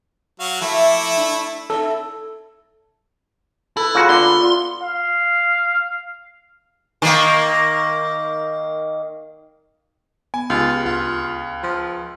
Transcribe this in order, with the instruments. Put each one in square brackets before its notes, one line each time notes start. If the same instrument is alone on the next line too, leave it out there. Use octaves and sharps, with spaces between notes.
[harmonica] F#3 F#4 F5
[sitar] F3 A#3 E5 [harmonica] A3 E4
[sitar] D4
[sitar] C4 D#4 E4 [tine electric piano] A4
[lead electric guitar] E4 [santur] A4 B4
[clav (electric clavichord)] C#3 F#4 [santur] A#3 F4
[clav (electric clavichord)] D3 [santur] B3 B4 D5 [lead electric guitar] C6
[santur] F4 E5
[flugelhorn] F5
[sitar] D#3 A#3
[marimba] B3 [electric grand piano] G#5
[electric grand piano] C#2 [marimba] D#4 G4 G#4 [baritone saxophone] F4
[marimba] D2 [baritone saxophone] F4
[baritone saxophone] F3